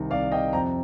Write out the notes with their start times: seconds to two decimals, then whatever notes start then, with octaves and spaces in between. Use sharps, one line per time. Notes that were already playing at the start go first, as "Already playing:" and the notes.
Already playing: C2 D#3
0.10 C2 D5 F5
0.32 C3 D#5 G5
0.53 F2 G5 A#5